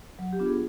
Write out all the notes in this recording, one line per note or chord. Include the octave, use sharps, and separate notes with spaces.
F#3
G4
B3 D4 F4
G#4